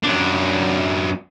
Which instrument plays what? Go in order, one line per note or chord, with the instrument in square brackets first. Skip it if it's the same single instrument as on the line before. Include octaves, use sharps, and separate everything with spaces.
[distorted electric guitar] F#2 D4